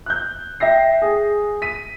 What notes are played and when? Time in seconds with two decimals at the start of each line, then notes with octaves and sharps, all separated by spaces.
0.06 F#6 G6
0.60 E5 G5 A#6 C7
1.02 G#4
1.62 B6 D#7